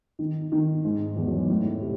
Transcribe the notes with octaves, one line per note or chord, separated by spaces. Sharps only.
D#3
D#3
G#2
E2
F#2
A2
C3